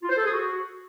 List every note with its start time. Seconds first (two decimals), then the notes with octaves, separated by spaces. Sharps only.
0.02 F4
0.10 C5
0.17 A4
0.25 G#4
0.32 F#4